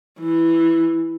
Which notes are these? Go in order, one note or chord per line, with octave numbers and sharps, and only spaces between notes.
E3